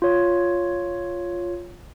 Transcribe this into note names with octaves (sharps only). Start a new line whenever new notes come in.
F4 C#5